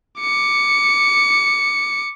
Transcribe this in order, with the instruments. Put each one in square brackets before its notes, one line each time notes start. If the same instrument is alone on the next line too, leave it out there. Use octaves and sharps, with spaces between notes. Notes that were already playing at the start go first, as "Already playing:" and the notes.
[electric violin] D6 C#7